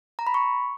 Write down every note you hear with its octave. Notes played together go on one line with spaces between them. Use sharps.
A#5
B5
C#6